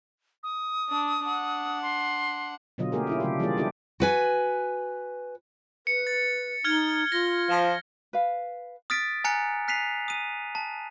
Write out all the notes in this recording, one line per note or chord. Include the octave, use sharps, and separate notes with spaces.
D#6
D4
D4 F#5
C6
B2 D3 F#3 F4 D#5
A3 A#3 G4 G#4 A#4
C#4 E4 F4
C#3 F#3 A3 D4 G4
E3 G3 A#3 F4 G#4 D5
B3 D4 E4 F4 G4 A4
F#4 B4 G#5
B4 C#7
A6
D#4 F6 G#6 G7
F4 A#6 G7
F3
B4 F5
D#6 F6 A6 B6 D7
G#5 A#5 F6 F#6 C#7
F6 F#6 B6 C7 D#7 F7
D#6 D#7
A5